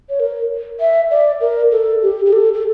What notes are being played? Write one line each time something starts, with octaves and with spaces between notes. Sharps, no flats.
C#5
A#4
E5
D5
A#4
A4
G4
G4
A4
A4